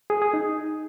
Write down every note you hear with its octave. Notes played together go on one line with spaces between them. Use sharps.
G#4
G#4
D#4